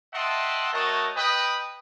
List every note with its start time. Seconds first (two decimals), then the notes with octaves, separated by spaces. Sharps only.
0.13 D#5 E5 F#5 G5 A5 C6
0.72 A3 F#4 A#4 C#5 D#5 A5
1.16 B4 D#5 G5 B5 D#6